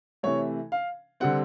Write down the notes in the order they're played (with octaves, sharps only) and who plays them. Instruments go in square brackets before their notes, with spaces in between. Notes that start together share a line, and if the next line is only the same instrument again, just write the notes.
[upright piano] C3 E3 A3 C#5
F5
D3 G3 C4 F#5